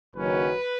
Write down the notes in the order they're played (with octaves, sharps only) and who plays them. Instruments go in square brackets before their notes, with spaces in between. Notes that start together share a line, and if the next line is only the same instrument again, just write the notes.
[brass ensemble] F#1 F#2 D#3 F#3 C#4 B4